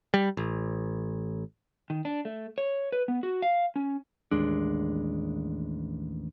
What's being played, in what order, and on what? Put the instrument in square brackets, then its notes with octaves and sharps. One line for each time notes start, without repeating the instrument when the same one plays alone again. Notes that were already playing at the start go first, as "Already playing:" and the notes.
[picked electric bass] G3
A1
[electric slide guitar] D#3
D4
A3
C#5
B4
B3
F#4
F5
C#4
[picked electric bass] A1 D#2 G#3 D4